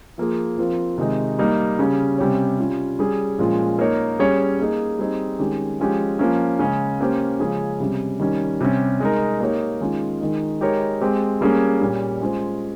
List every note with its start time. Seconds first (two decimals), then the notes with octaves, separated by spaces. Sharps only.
0.18 F3 A#3 F4 G#4
0.58 F3 C4 F4 A#4
0.98 C3 D#3 G#3 D#4
1.39 G3 A#3 D#4
1.79 C#3 G3 C#4
2.18 C3 G3 C#4 G4 C#5
2.59 G3 C#4 F4
2.99 G3 C#4 G#4
3.38 A#2 F3 G#3 C#4 F4
3.79 A#3 D#4 A#4 C#5
4.19 G3 C#4 G#4 C#5
4.59 A#3 D#4 G#4
4.99 G3 C4 D#4 G#4
5.39 D#3 G#3 C#4 G4
5.80 F3 G#3 C#4 G4
6.19 F3 A#3 C#4
6.59 C#3 G#3 C#4
7.00 A#3 C#4 G4 C5
7.40 C#3 F3 G#3 C#4 G#4
7.80 C3 G3 C#4
8.19 D#3 G3 C#4
8.61 C3 G3 C#4
9.00 G#3 D#4 A#4
9.40 A#3 D#4 G4 A#4 C#5
9.81 D#3 G#3 C#4 F4
10.20 D#3 G#3 D#4
10.61 G#3 D#4 G4 A#4 C#5
11.01 G#3 C4 G4
11.41 G3 A#3 C#4 G#4
11.81 A#2 G3 C#4
12.21 G#3 C#4 F4 C5